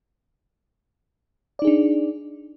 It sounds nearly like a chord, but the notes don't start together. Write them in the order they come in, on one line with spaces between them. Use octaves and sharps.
D5 D#4 G#4 D4